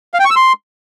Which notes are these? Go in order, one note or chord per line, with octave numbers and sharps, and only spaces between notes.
F5
G5
C#6
E6
C6